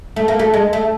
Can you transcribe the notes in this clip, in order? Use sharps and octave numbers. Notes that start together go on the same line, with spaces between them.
A3
A#3
A3
G#3
A3